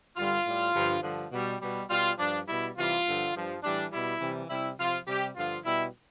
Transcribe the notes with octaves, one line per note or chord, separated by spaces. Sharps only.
G2 D3 G3 F4
A2 G3
G2 D3 F3
G2 D3 F3
B2 G3
B2 G3
B2 G3 F4
G2 F3 D4
B2 G3 E4
C3 E3 G3 F4
G2 D3 F3
G2 F3
A2 E3 G3 D4
B2 G3 E4
C3 E3 G3
C3 G3 E4
C3 F3 F4
C3 G3 G4
G2 D3 F3 F4
B2 G3 E4